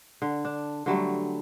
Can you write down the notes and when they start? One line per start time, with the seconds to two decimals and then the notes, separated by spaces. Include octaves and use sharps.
0.22 D3
0.45 D4
0.86 D3 F#3 G3 A3